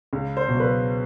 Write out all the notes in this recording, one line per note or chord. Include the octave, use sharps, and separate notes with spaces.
C#2
C5
B2 F#3
B4